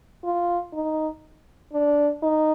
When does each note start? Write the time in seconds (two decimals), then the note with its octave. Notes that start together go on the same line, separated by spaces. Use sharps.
0.24 F4
0.73 D#4
1.73 D4
2.22 D#4